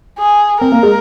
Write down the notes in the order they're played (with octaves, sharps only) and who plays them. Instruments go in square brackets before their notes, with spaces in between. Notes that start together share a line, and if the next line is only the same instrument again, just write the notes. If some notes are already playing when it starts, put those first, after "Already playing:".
[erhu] G#4
[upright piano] C4 [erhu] A#4
[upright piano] A#3
G#3